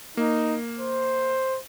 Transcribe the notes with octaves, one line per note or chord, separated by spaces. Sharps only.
A#3 D#4
C5